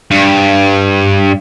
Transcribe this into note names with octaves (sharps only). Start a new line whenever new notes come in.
G2